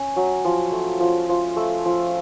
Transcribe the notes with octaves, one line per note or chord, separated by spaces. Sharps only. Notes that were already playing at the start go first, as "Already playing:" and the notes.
Already playing: C#4
F#3
F3
A3
F3
F3
A3
F3